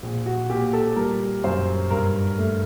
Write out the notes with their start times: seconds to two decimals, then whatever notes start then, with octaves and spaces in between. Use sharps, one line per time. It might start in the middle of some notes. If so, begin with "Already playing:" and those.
0.03 A#1
0.26 F#4
0.49 A#2 G4
0.73 A4
0.96 G3 A#4
1.43 F#2 C5
1.90 G2 A#4
2.38 A3